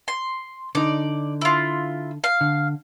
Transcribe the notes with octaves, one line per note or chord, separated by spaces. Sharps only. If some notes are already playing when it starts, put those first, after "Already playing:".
C6
D3 D#4 D5
E4 F4
F5
D3